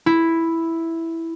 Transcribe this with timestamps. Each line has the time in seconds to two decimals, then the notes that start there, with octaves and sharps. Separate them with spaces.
0.06 E4